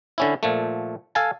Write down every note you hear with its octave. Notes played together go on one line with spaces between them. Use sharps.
D3 C#4 E4
A#2 F3 A3
A4 F5 G#5 A5